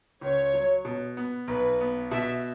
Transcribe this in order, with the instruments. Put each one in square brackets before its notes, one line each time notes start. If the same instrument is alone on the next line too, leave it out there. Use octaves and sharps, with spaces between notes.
[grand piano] C#2 [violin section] C#5
[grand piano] F#3
B2
B3
[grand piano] B1 [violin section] B4
[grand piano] B3
[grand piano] B2 [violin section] E5